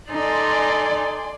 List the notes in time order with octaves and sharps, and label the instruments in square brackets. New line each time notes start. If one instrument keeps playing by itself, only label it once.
[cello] D#4 A4 [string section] D5 G#5 C6